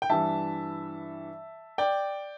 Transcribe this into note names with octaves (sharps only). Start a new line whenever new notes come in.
G5
G2 E3 G3 E5 A5
D5 G5